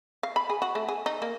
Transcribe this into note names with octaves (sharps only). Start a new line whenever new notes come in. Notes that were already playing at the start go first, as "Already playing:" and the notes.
F5
B5
G#4
F#4
A3
G#4
D#4
A#3